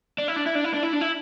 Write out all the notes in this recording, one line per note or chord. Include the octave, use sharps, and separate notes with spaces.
D4
E4
D4
E4
D4
E4
D4
E4
D4
E4